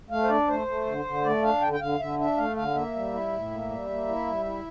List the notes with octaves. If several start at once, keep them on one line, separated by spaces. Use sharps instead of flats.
A3 F5
C5
D4 D5
A3 C5
A3
D3
D3
A3 D5
D4 F5
D3 G5
G5
D3 F5
D3 E5
D4 E5
A3 F5
D3 F5
A#3 E5
G3
E4
A2
A#3
G3
A#3
E4
G3
E4